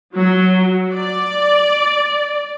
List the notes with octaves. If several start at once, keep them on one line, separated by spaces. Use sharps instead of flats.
F#3
D5